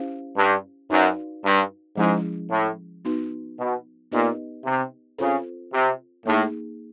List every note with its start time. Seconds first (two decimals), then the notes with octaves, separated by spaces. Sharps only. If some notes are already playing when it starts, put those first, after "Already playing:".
Already playing: C#4 E4 G4 C5 F5
0.37 G2
0.89 F#2 D#4 F#4 B4 D5 F5
1.43 G2
1.97 G#2 F3 G#3 C#4 E4 G#4
2.51 A2
3.05 B3 D#4 F#4 B4
3.58 B2
4.12 A#2 B3 D#4 G4 B4 D#5
4.65 C3
5.18 C#3 C4 F4 A4 C5
5.72 C3
6.25 A2 A#3 D#4 G#4